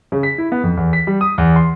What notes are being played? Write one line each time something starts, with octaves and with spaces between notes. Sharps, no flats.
C#3
B6
E4
B3
F2
E2
B6
G3
D#6
E2
C6